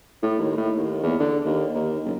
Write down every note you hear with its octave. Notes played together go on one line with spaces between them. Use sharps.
A2
D#2
A2
D#2
E2
D3
D#2
D#2
F#1